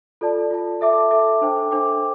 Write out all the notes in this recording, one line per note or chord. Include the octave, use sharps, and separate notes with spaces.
F4 A4 D5 A5
F4 A4 D5 A5
A4 E5 A5 D6
A4 E5 A5 D6
D4 A4 C5 G5 D6
D4 A4 C5 G5 D6